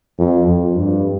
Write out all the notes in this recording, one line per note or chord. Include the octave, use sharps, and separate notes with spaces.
F2
F2
G2